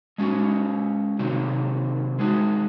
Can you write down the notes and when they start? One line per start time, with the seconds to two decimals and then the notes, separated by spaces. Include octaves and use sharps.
0.18 G#3 C#4 F#4
1.19 C3 D#3 F#3 C4
2.19 G#3 D#4 F#4